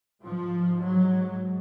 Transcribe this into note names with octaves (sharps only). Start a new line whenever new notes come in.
G#2 F3
F#3